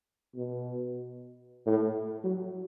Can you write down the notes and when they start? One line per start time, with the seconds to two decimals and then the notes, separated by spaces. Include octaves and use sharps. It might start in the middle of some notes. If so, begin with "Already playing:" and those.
0.35 B2
1.66 A2
2.24 F#3